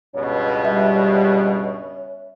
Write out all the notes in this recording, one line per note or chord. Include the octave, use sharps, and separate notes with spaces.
C#2 G2 B2 C#4
G3 E5